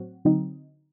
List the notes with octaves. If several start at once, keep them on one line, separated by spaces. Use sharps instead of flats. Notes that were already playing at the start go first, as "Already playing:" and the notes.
Already playing: A2 F#3 C4 F#4
D3 F#3 C4 D#4